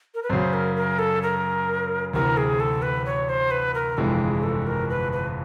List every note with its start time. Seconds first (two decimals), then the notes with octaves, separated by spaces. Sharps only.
0.14 A#4
0.23 B4
0.30 F#2 C#3 F#3 C5
0.53 A#4
0.76 A#4
0.99 A4
1.23 A#4
2.13 D2 C3 E3 A#4
2.37 G#4
2.60 A4
2.82 B4
3.06 C#5
3.29 C5
3.51 B4
3.74 A#4
3.97 G1 F2 C3 E3 G#3 A4
4.20 G#4
4.43 A4
4.67 A#4
4.89 B4
5.12 B4